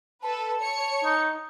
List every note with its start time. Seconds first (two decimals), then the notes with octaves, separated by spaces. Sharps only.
0.22 A4 B4 A5
0.61 C#5 C#7
1.04 D#4